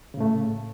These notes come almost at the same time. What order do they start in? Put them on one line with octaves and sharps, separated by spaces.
C#3 A2 A3